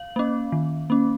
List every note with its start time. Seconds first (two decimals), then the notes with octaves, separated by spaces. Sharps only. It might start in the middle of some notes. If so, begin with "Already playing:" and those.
Already playing: F5
0.16 A#3 C#4
0.52 D#3
0.90 A#3 C#4